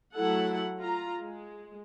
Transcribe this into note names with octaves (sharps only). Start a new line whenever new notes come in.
F#3 A3 E4 A4 F#5
F4 A#5
G#3